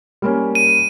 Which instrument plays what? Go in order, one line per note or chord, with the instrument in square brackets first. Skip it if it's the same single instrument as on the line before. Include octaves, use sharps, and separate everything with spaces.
[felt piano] G3 A#3 C#4
[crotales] D#7